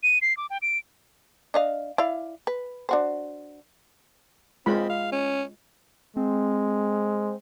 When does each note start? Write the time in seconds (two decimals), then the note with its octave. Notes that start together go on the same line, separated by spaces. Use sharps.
0.03 D#7
0.22 C7
0.37 D6
0.50 G5
0.62 D7
1.54 D4 D#5 F5
1.98 E4 D5 F5
2.47 B4
2.89 D4 F#4 C5
4.66 G#3 C4 F4 B5
4.89 F5
5.12 C#4
6.17 G#3 C4